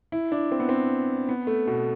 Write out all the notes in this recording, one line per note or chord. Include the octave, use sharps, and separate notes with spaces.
E4
D4
C4
B3
C4
B3
A3
B2